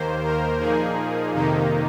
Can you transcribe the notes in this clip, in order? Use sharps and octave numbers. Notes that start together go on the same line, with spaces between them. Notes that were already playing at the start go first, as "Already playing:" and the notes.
Already playing: D#2 D#3 A#3 C5
A#4
A#2 F3 A#3 D#4 G#4
F2 C3 D#3 A#3 D#4